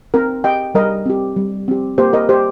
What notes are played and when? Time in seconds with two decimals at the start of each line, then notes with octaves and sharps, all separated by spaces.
0.14 C4 A#4
0.44 G4 D#5 G5
0.75 G3 A#4 D#5
1.06 C4 G4
1.36 G3
1.68 C4 G4
1.98 A#3 G4 C5
2.13 A#4 D#5
2.29 G4 C5